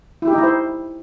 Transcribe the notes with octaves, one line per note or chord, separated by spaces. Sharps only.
E4
G4
D#4
E4
C5